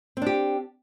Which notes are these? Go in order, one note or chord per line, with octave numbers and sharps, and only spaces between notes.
C4 D4 G4